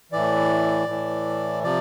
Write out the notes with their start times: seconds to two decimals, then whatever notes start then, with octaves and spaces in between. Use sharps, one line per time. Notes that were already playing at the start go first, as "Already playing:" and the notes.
0.12 A2 E3 D5
0.88 A2 E3
1.63 C3 F3 D5